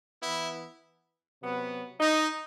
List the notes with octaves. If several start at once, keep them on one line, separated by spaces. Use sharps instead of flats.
E3 B3 E4
C3 F#3 B3
D#4